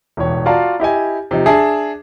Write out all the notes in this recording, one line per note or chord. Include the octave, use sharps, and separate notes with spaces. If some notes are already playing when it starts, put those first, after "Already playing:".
E1 A1 C#5
F4 F#4 D5 F5 A5 A#5
E4 G4 D#5 G#5
C3 F3 D#4
D4 G#4 E5 A5